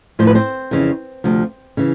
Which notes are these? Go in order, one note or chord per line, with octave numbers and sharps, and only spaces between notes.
A2 F3 C5
B4
C4 C5
F2 C#3 E3
D2 C3 F3
C#3 E3